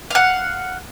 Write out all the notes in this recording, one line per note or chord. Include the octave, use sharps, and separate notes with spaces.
F5 F#5